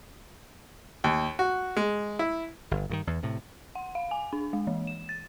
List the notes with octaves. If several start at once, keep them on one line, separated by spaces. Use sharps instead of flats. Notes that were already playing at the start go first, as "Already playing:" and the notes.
D#2
F#4
G#3
E4
G1
G2 D3 D#3
E2
A2 C3
F#5
F5
G#5
D4
G#3
E3
E7
A6